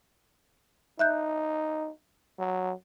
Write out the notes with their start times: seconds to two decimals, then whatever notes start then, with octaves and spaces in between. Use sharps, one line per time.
0.99 D#4 E5 F#6 G6
2.39 F#3